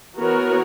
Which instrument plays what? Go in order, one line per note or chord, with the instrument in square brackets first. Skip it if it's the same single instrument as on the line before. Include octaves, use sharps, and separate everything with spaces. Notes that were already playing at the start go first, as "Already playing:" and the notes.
[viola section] E3 B3 F#4 A#4 C#5